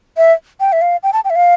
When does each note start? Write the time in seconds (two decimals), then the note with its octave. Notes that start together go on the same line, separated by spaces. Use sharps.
0.17 E5
0.60 G5
0.72 E5
0.82 F5
1.03 G5
1.13 A5
1.25 G5
1.30 E5
1.36 F5